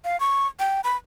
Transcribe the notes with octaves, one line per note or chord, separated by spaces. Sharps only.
F5
C#6
G5
B5